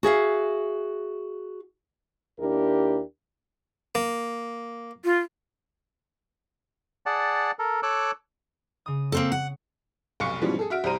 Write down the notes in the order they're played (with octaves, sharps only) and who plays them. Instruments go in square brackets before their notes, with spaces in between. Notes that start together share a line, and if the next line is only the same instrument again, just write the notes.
[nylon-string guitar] F#4 G#4 E5 F5
[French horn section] D#2 D4 E4 G4 A#4
[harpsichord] A#3
[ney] F4
[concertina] G#4 D5 F#5 A5
A4 A#4
A4 C#5 D6 E6 F#6
[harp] C#3 D#6
[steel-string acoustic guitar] A#3 C4 A4
F#5
[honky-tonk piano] F1 B1 F5 C#6 C#7
G#2 B2 E3 F3 G3 C#4
G#4 A4
F#4 E5 F6 D7
C2 G3 C5 A#5 D#7